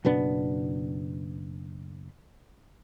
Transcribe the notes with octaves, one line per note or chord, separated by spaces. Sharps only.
F#1 B2 B3 D4